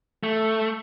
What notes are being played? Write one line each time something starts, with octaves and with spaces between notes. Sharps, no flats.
A3